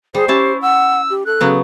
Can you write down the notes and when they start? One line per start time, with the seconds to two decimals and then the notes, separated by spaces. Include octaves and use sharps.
0.14 G3 G#4 C5
0.28 C#4 E4 G4 A5
0.62 F#5 E6
1.10 G4
1.26 A4 F#6
1.40 C#3 F#3 B3